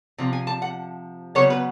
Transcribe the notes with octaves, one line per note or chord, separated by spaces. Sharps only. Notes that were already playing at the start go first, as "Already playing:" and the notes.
C3 F3
G#5
A5
F#5
C#3 F#3 B3 C#5
B4